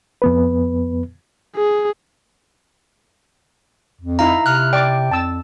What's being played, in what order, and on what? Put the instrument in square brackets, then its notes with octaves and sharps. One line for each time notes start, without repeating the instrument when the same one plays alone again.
[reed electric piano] F2 B3 B4
[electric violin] G#4
[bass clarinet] F2
[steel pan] D#4 E4 F5 [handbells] A#5
[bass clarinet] C3 [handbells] F6 F#6
[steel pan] D5 D6 [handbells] G5
[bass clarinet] F2 [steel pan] A5 E6